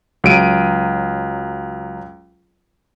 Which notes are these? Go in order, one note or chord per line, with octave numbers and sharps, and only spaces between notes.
C#2 F#3 D7 D#7